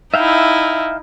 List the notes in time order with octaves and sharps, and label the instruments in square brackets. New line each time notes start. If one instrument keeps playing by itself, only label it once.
[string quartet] D#4 E4 [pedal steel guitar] E5 F5 G5